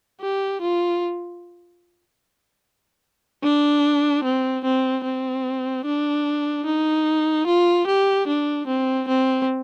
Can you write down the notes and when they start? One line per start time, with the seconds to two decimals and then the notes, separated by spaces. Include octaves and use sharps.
0.20 G4
0.61 F4
3.43 D4
4.24 C4
4.65 C4
5.04 C4
5.85 D4
6.65 D#4
7.47 F4
7.87 G4
8.27 D4
8.67 C4
9.08 C4